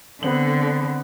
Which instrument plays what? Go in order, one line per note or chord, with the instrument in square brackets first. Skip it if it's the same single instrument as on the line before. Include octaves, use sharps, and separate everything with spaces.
[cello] D3 [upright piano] B3 C4 F#7